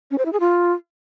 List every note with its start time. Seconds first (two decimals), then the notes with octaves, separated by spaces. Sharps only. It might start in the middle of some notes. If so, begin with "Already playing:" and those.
0.11 C#4
0.18 C5
0.25 E4
0.33 G#4
0.40 F4